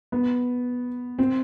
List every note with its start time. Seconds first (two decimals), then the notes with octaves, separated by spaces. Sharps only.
0.12 B3
1.19 C4